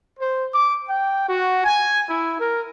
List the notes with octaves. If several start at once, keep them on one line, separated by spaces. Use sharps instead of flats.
C5
D6
G5
F#4
G#5
E4
A#4